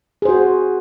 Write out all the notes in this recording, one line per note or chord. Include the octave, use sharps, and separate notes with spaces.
F#4 G#4 C5